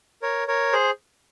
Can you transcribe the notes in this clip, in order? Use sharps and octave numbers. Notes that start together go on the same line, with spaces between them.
A#4 C#5
A#4 C#5
G#4 C5